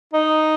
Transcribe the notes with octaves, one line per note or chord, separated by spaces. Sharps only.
D#4